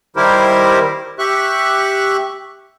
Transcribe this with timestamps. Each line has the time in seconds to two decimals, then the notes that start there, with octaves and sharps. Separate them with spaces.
0.16 D#3 G3 E4 G4 A#4 C5
1.19 G4 E5 C#6 F#6